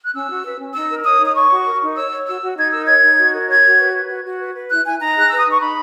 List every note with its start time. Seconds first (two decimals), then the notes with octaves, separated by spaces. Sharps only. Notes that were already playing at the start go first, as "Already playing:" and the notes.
0.06 F#6
0.14 C#4 E6
0.29 F#4
0.44 B4
0.59 C#4
0.75 D#4 E6
0.90 A#4
1.05 C#5 D#6
1.21 D#4
1.27 D#6
1.35 C#5 C#6
1.51 F#4
1.66 A#4
1.81 D#4
1.96 C#5 E6
2.12 C#5
2.27 F#4 E6
2.42 F#4
2.57 D#4 G#6
2.72 A#4 E6
2.87 C#5 G#6
3.03 D#4
3.18 F#4
3.33 A#4
3.48 C#5 G#6
3.64 F#4
3.79 B4
3.94 B4
4.09 F#4
4.24 F#4
4.40 B4
4.54 B4
4.70 E4 F#6
4.85 E4 G#5
5.00 D#4 A#5
5.15 G#4 F#6
5.29 B4 E6
5.39 D#6
5.46 D#4 C#6
5.61 D#4 B5